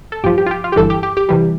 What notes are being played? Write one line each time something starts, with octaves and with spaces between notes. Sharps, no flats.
A4
A1 G2 F3 G4
G4
F4
G4
F4
G4
G1 G2 E3 A4
G4
G4
G4
C3 E3 G3